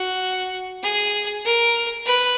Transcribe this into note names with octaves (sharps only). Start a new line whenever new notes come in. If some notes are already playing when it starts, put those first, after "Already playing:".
Already playing: F#4
G#4
A#4
B4